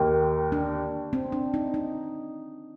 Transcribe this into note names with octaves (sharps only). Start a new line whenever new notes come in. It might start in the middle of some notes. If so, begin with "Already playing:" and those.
Already playing: D#2 D#3 A#3
D4
C4
D4
D#4
D#4